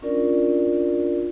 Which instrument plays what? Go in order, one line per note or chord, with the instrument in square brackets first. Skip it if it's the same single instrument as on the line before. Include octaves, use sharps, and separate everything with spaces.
[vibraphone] C#4 D4 F4 A#4 D5